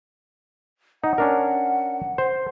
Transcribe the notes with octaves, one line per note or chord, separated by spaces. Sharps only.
D#4 F#5
C#4 D4 A#4
C5